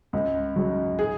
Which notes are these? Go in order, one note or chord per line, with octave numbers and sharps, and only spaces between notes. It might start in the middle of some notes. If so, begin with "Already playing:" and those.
C#2
C#3 F#3
G#4